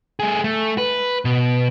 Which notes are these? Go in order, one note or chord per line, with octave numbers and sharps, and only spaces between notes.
A3 G#4
A3
B4
B2